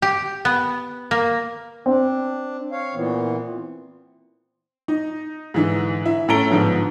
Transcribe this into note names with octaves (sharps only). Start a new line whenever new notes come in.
G4
B3
A#3
C4 D4
C#5 F5
A#2 E3 B3
D#4
G#2 D3 E3
E4
A2 C#4 A4 A#5 D7 G7
G#2 D3 F3 B3